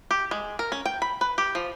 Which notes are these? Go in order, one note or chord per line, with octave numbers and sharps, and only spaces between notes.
G4
G#3
A#4
C#4
G5
B5
B4
G4
F3